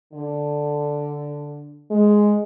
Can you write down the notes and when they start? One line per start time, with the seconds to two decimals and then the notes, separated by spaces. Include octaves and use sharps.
0.13 D3
1.91 G#3